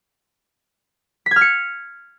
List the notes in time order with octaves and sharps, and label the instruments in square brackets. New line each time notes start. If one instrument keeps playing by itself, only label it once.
[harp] B6
G#6
F6
C#7